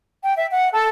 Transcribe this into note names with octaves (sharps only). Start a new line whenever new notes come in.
G5
E5
F#5
A4